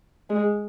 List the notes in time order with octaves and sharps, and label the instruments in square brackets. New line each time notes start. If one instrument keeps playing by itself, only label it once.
[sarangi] G#3